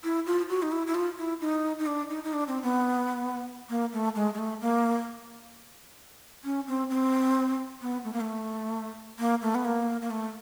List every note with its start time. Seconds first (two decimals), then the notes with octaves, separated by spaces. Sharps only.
0.04 E4
0.26 F4
0.49 F#4
0.62 D#4
0.72 E4
0.87 E4
0.95 F4
1.18 E4
1.41 D#4
1.79 D#4
1.86 D4
2.10 D#4
2.24 D#4
2.33 D4
2.48 C4
2.63 B3
3.69 A#3
3.93 A3
4.15 G#3
4.34 G#3
4.38 A3
4.61 A#3
6.44 C#4
6.68 C4
6.90 C4
7.82 B3
8.04 A3
8.13 A#3
8.20 A3
9.19 A#3
9.42 A3
9.55 B3
9.65 A#3
10.01 A#3
10.10 A3